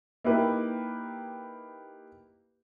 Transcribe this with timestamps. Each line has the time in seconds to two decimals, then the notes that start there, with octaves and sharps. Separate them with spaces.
0.24 A#3 D#4 E4 G4 B4